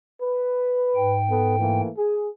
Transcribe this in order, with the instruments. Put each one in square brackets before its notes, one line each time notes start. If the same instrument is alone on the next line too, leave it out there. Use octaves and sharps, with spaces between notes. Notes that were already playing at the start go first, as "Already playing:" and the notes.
[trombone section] B4
[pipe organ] G#2 G5
[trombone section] B3 A4
E3 A3 A#3
G#4